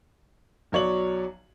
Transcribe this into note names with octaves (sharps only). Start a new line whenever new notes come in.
B1 F#3 C#5 D5 F#7